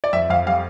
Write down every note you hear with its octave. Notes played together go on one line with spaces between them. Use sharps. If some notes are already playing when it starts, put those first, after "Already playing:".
D5
F2 E5
F2 F5
G3 F5